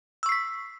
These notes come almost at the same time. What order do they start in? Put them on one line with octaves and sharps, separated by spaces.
E6 C#6 C7 B6